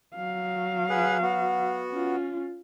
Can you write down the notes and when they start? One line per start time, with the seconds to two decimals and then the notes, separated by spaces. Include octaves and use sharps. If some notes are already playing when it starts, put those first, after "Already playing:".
0.15 F#3 F5
0.90 G#4 B4 F#5
1.22 B3 F#4
1.92 C#4 F4